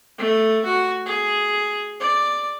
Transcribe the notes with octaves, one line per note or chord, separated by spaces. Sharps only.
A3
F#4
G#4
D5